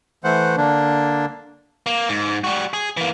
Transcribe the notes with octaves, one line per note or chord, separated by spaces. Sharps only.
E3 A3 C5 F#5
D3 A#3 D4
A#3
G#2
G3 F#4
G#4
E3 A#3